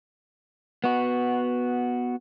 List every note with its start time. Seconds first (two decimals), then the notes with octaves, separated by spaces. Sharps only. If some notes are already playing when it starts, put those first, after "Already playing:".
0.84 B3 F#4